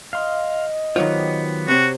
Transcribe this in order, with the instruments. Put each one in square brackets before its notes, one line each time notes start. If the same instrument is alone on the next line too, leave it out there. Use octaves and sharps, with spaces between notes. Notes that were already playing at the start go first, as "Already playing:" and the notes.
[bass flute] D#5 [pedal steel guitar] F5 C6
[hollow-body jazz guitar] D#3 F#3 F4 [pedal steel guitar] B3 G4 C5
[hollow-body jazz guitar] C3 C4 [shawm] F#4 [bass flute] C#5